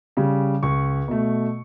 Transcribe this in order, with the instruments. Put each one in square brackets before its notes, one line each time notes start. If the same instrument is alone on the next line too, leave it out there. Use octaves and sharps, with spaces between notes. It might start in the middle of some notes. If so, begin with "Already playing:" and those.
[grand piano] C#3 G3
C#2 C#6
B2 A3